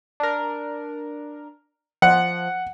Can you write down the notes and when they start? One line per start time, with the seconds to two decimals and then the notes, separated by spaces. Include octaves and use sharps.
0.20 D4 A#4
2.02 F3 F#5